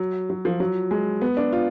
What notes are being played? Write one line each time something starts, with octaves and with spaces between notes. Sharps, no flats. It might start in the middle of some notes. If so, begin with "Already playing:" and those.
Already playing: F#3
F#3
F3
F#3
G#3
B3
D4
F4